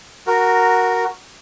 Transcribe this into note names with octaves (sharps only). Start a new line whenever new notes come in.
F#4 A#4